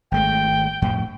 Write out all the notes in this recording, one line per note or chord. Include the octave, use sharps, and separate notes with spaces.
G#1 G#3 A3 G5
F2 A2